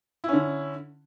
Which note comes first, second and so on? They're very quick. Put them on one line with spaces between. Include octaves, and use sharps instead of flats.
E4 C#4 D3